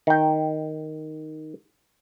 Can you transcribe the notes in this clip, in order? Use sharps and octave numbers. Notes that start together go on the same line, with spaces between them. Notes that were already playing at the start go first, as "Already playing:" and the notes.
D#3 G5